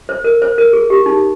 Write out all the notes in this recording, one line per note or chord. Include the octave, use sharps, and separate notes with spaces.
C5
A#4
C5
A#4
G#4
G4
D#4